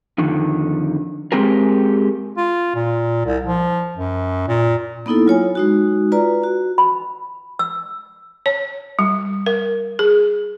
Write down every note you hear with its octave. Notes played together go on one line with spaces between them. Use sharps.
F2 D3 D#3
G#3 C4 G4 G#4 A#4
F4
A#2
C2
F3
F#2
A#2
A#3 B3 D#4 E4 A4
F#3 F4 C#5 G#5
G#3 D#4 F#4
F4 B4 D5 A#5
F#4
B5
E6
C#5
G3
A#4
G#4